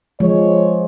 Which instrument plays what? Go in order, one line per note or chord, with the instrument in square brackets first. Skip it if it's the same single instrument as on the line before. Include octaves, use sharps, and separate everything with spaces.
[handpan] F3 G#3 [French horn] C#5